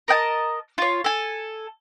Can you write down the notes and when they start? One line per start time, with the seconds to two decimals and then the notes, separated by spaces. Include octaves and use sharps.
0.08 A#4 D#5 G5 A5
0.78 F4 C#5
1.04 A4 G#5